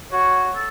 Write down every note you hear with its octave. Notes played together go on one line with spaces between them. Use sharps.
F#4 C#5
A4